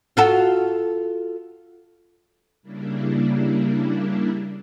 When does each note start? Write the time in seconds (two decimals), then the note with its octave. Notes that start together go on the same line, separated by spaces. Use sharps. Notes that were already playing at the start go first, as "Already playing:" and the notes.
0.17 F4 F#4 A4
2.63 C#3 G3 A#3 D4 E4